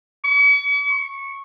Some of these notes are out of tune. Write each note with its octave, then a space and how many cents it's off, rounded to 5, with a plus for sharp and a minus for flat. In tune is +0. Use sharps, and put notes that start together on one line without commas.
C#6 +45
C#6 -15